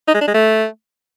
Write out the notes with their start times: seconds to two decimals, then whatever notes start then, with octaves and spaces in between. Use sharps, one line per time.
0.08 D#4
0.14 G#3
0.21 D4
0.27 G#3
0.34 A3